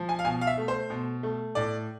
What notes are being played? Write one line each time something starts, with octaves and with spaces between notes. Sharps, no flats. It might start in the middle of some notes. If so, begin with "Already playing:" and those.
Already playing: F3
G#5
F5
B2 G#5
F5
E5
A3
C5
B2
A3
A2 D5